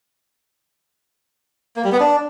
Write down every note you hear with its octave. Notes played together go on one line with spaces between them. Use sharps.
A#3
G3
B3
D4